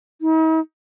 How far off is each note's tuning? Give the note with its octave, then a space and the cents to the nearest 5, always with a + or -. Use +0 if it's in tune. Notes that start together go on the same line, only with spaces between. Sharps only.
D#4 +45